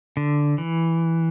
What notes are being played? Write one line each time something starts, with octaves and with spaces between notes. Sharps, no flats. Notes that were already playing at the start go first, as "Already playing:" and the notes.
D3
E3